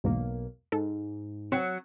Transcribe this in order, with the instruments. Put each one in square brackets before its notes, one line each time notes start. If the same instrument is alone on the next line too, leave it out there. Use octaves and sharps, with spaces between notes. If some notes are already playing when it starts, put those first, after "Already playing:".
[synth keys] B1 A#3 [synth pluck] E2 G#2 B2
[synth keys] G#2 [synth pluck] A4
[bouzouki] F#3 [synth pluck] C4